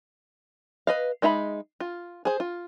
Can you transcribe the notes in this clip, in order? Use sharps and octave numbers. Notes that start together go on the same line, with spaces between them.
B4 D#5 F5
G#3 D#4 E5 A#5 B5
F4
G#4 C5
F4